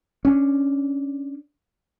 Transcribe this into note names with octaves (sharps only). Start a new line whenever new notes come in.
C#4 D4